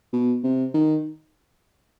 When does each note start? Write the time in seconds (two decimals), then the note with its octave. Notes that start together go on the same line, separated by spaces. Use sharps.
0.13 B2
0.43 C3
0.74 D#3